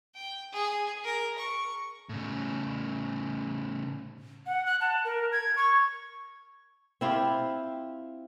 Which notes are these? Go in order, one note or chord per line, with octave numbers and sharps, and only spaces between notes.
G5
G#4
A#4
C#6
A2 C#3
F#5
F#6
A5
A#4
G#6
C#6
C4 E4 F4 G4